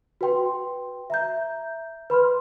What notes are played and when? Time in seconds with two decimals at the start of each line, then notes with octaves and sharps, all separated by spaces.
0.21 F#4 B4 G5 C6
1.10 E5 A#5 G6
2.10 B4 B5 C6 F6